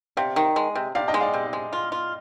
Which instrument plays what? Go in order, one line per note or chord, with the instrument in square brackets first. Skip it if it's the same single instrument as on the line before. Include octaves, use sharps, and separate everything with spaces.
[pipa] C3 [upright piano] D5 F5
[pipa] D#3
G#3
C3
[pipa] C3 [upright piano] D5 F5
[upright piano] D#5 G5
[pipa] G#3
[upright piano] D5 F5
[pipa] C3
G#3
F4
F4